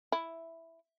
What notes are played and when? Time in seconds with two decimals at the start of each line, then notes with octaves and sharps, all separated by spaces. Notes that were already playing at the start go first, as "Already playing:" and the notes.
0.12 E4